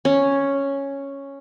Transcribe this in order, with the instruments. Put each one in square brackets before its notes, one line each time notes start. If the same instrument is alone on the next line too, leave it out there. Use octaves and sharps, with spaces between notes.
[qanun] C#4